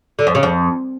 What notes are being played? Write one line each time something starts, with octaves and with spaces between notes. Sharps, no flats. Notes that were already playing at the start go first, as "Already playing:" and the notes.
D3
F2
C#3
F2